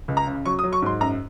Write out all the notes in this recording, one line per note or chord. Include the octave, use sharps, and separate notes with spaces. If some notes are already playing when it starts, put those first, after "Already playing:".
C#2
A#5
C#3
F#3 C#6
D#6
F#3
C#6
G#2 C6
F#2 A#5